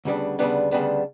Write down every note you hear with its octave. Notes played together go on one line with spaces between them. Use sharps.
D2 C#3 G3 B3 D4
D2 C#3 G3 B3 D4
D2 C#3 G3 B3 D4